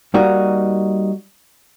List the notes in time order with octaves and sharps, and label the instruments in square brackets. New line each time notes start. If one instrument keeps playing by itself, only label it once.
[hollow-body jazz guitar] G3 A#3 D#4 F#4